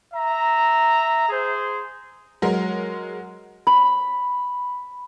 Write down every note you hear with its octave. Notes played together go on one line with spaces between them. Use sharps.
E5 A#5
G#4 C5
F#3 G#3 A#4
B5